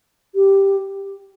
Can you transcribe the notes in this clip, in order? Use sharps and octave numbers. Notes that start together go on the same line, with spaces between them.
G4